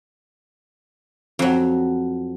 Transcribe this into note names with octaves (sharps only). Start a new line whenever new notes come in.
F2 F#3